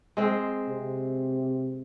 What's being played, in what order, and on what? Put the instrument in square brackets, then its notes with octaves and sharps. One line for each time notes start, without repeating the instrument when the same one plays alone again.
[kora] G#3 C4
[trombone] C3